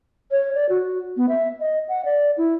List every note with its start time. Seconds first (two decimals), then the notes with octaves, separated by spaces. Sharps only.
0.31 C#5
0.55 D5
0.69 F#4
1.17 B3
1.29 E5
1.60 D#5
1.88 F#5
2.05 D5
2.37 E4